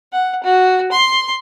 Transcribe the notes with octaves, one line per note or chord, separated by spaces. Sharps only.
F#5
F#4
C6